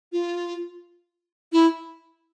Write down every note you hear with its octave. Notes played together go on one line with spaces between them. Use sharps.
F4
E4